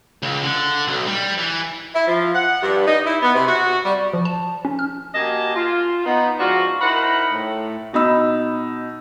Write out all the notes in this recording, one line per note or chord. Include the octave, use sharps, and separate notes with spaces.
C#2
D3
B1
G3
E3
E4
F3
F#5
G2
D#4
E4
B3
C3
F#4
G3
F3
A5
C#4
F6
A#3 F#4 G4 D#5 G#5 A5
F4
B3 D#4
G#2 F3 D4 F4 F#4
D#4 E4 A#4 C5 F#5 B5
A2
B2 D#4 B5 E6